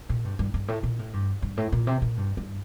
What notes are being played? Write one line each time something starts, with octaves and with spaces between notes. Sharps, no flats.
A#2
G2
G2
G2
A2
A#2
A2
G2
G2
A2
A#2
C3
A#2
G2
G2